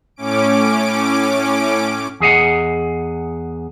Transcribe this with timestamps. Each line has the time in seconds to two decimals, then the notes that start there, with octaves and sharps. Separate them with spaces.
0.16 A2 C#4 D6 D7
2.20 E2 G#4 D#5 F#5